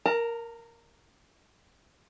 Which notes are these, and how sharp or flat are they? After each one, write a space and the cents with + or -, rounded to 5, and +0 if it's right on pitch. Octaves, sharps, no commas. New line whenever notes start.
A#4 +0 A5 +40